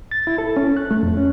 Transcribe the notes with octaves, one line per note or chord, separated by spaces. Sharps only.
A6
E4
A4
C#4
F#6
A3
F2
C#4